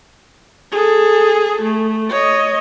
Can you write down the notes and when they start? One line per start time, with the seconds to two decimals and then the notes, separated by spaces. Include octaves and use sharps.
0.72 G#4 A4
1.62 A3
2.10 C#5 D#5